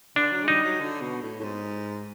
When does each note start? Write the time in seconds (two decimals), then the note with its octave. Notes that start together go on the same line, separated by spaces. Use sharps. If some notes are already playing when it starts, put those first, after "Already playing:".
0.16 D3 D4
0.32 F#3
0.44 G#3
0.48 G3 D#4
0.64 F#3
0.80 D3
1.01 B2
1.22 A2
1.40 A2
1.43 G#2